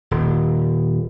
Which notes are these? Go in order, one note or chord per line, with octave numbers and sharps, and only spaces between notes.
D#1